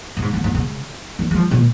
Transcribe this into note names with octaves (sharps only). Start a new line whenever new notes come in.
A#2
G#2
G#2
G#2
C#3
D#3
G#3
F3
A#2